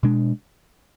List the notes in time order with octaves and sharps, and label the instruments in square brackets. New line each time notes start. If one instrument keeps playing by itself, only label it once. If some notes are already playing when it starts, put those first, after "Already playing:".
[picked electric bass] B2 G#3 D4